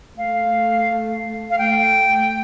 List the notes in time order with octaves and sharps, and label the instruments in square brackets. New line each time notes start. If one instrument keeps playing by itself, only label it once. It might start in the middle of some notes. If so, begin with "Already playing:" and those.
[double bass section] A3 [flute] F5
[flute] F5
[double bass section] A3 [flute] G5